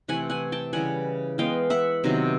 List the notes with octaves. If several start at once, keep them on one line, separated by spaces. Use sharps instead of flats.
C3 E3 A3 F#5 G#5
F#5 G#5
G5 A5
C#3 E3 G3 F#5 G#5
E3 G#3 B3 F5 G5
E5 F#5
C3 D#3 F#3 B3